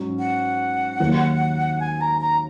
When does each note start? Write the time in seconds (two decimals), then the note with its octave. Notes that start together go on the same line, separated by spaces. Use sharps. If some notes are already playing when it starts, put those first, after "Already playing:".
Already playing: G#2 F#3 C#4
0.19 F#5
0.99 D#2 D#3 F#3 A#3
1.80 G#5
2.01 A#5
2.21 A#5